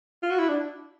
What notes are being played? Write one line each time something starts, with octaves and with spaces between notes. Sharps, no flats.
F4
F#4
E4
D4